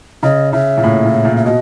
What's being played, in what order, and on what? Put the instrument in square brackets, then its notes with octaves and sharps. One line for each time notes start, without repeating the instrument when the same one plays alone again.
[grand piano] C#3 [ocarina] D#5
[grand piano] C#3 [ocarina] E5
[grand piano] A#2
A2
A#2
A#2
[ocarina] E5
[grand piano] B2 [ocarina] D#5